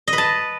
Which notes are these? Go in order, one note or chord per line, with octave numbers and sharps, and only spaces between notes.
D#5
B4
A5